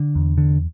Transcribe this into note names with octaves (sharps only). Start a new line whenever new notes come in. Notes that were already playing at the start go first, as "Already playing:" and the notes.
Already playing: D3
E2
D3